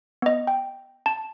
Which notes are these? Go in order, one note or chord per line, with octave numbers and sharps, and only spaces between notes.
B3 D#5
G5
A5